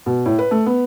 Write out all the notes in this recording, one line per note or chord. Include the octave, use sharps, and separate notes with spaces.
B2
A2
B4
A3
B3